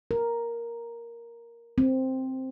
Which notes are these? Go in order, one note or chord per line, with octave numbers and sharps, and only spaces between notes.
A#4
C4